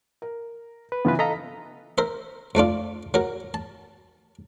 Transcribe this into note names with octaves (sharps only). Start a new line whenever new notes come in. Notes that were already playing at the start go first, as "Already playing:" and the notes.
A#4
B4
C#3 E3 B3 F4 B4
A4 D#5 F5 A#5 B6
A#4 C5 E5
F2 A3 D4 F4
F#3 A#4
A5